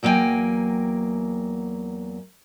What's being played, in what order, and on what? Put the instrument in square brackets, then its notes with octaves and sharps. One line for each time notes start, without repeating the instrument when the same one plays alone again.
[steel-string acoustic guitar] E2 F#3 A#3 D#5 G5 G#5